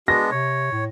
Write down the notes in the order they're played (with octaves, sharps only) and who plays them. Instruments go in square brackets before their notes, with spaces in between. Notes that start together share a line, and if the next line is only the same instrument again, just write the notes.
[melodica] G#3 B3 D4 [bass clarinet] F#4 [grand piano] A#6
[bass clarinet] C3 [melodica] C#5
[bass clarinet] A2